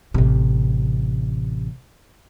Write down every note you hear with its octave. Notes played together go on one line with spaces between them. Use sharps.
A1 C3